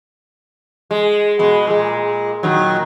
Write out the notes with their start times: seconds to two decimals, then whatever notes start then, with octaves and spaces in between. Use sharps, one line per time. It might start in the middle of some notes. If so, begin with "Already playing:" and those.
0.91 G#3
1.39 B2 G#3
1.67 A#2 G#3
2.43 A#2 D#3 F#3